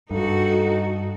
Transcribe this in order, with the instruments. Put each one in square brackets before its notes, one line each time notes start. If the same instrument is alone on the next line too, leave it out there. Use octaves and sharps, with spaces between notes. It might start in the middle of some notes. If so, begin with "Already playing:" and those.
[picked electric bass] G2 [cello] D#4 F#4 [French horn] A4